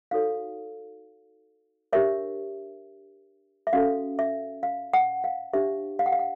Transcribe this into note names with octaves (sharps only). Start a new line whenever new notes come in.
D#4 F#4 A4 C#5 F5
D4 G4 A#4 C#5 E5
E5
C#4 F#4 A4 F5
E5
F5
F#5
F5
D4 G4 C5 E5
F5
F#5
F5
F#5